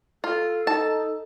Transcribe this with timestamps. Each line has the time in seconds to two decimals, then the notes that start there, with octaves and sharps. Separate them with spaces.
0.24 F4 A4
0.67 D#4 A5